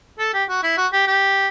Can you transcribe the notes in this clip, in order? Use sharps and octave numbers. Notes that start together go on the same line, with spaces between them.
A4
G4
F#4
E4
F#4
G4
G4